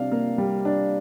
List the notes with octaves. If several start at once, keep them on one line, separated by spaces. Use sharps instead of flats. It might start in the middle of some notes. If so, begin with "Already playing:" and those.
Already playing: C3 G3 D4 F5
A#3
G3
D4